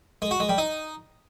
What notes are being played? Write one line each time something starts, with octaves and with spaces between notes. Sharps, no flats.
G#3
F#4
G#3
G3
D#4